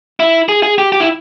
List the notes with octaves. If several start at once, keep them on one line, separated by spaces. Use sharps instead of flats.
E4
G#4
G#4
G4
G4
E4